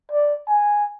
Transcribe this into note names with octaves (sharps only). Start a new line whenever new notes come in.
D5
G#5